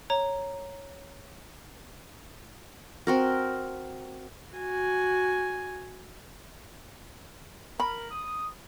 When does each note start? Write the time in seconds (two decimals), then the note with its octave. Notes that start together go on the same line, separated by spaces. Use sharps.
0.10 C#5 A#5
3.07 C4 F#4 A#4
4.54 F#4 G#5
7.80 A#4 B5
8.11 D#6